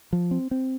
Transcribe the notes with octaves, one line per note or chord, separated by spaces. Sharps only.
F3
C4
C4